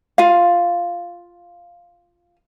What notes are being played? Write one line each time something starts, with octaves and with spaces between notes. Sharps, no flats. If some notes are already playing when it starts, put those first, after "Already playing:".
F4 F5